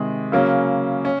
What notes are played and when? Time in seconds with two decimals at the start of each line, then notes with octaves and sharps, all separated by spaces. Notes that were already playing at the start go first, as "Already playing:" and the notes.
Already playing: C3 D#3 G#3
0.32 C#3 F#3 A#3 C#4
1.05 C#4